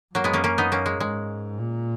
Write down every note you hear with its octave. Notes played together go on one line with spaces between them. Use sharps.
F#2 F#3 A#3
G#3 B3
A#3 C#4
A#3 C#4
B3 D#4
A#3 C#4
G#3
G#2 G#3
A#2